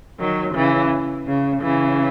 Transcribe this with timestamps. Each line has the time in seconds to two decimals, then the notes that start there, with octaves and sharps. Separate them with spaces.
0.20 D#3 F#3
0.55 C#3 E3
1.28 C#3
1.62 C#3 E3